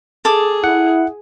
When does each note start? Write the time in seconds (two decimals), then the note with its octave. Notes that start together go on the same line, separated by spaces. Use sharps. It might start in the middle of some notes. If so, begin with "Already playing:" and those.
0.25 G#4 A4 D6
0.64 E4 F#5